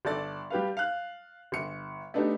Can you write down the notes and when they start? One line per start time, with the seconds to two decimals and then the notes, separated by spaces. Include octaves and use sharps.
0.05 G1 A4 D5 A6
0.50 G3 G4 B4 F5
0.77 F5 F#6
1.52 G1 C#7
2.14 A3 B3 D4 D#4 G4